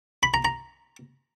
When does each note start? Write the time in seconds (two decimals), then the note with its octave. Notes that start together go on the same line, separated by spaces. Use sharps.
0.23 B5
0.34 A#5
0.45 A#5